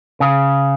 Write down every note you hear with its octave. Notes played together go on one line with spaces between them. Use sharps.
C#3